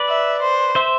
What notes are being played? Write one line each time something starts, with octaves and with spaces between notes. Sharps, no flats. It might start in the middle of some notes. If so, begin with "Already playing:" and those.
Already playing: B4 D5
E5
C5
C5 E5